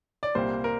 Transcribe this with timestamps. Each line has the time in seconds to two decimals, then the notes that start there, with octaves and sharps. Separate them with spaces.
0.23 D5
0.35 C2 A#2 G3 A#3 C5
0.64 A#4